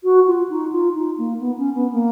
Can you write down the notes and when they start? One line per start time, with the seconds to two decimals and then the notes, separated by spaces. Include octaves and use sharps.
0.04 F#4
0.27 F4
0.49 D#4
0.72 F4
0.95 D#4
1.18 A#3
1.40 B3
1.58 C#4
1.75 B3
1.92 A#3